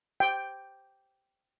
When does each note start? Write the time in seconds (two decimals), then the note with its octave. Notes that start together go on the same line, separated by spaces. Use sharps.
0.20 G5